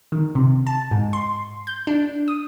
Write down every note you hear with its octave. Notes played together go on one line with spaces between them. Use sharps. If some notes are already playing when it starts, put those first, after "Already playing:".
D#3
C3
A5
G#2
C6
G6
D4
D#6